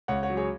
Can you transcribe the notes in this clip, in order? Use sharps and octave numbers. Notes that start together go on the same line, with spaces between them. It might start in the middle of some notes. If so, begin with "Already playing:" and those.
C#2 C#5 F#5
C#5 F#5
F#3
G#4 C#5